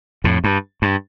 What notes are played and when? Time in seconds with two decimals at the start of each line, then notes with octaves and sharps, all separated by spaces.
0.24 F2 A2
0.44 G2
0.82 G2